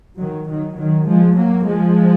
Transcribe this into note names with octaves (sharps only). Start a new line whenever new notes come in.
D#3 F#3
D#3 F#3
D#3 F#3
F3 G#3
F#3 A#3
F3 G#3